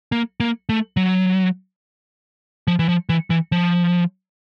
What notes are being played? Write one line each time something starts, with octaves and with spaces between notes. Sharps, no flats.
A#3
A#3
A3
F#3
F3
E3
F3
E3
E3
F3